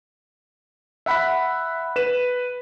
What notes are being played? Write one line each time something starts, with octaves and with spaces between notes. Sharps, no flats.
E5 F#5 B5 F#6 B6
B4 E7